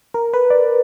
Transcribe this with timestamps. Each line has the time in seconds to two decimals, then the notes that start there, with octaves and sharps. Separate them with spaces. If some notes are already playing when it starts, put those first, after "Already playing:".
0.14 A#4
0.33 B4
0.50 D5